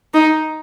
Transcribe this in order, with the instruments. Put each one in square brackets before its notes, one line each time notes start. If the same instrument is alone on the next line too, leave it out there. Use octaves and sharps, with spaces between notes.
[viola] D#4